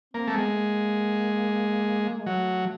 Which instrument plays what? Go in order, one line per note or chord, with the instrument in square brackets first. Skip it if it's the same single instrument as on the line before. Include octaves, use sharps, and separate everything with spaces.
[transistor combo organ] A#3 [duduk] C4
[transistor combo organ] A3
[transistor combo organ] G#3 [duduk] B3
[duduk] A3
A#3
G#3
[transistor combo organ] F#3 [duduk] A3